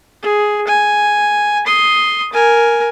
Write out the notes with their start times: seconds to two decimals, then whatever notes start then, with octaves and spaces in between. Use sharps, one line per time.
0.22 G#4
0.68 G#5
1.66 C6 D#6
2.33 A#4 G#5